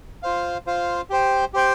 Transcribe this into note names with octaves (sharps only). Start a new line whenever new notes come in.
F4 C5 F5
F4 C5 F5
G4 C5 G5
G4 C5 G5